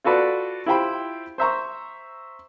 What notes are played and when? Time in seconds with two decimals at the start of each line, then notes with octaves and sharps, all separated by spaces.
0.04 F4 F#4 A4 B4 D5
0.66 E4 F4 G4 C5 G5 B5
1.38 C5 E5 A#5 C#6